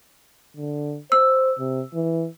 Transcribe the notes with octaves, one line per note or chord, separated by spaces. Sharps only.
D3
C5 E6
C3
E3